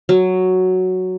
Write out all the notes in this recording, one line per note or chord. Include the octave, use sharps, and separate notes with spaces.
F#3